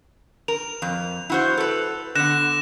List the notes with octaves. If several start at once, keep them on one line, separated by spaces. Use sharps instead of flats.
A#4 F7
F2
E4 F#4 C5
A4 B4
D3 B3 F#6 A#6 E7